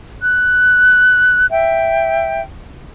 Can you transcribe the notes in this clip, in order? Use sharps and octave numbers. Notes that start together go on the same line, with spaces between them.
F#6
E5 G5